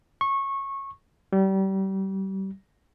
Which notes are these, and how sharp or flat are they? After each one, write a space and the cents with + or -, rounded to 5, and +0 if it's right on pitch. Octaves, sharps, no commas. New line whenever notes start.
C#6 -20
G3 -30